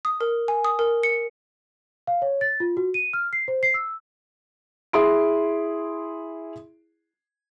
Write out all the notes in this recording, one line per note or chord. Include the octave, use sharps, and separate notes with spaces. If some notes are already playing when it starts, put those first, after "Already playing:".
D#6
A#4
G#5
D#6
A#4
C#7
F5
C#5
A6
F4
F#4
D#7
F6
C7
C5
C7
E6
E4 G#4 C6 D7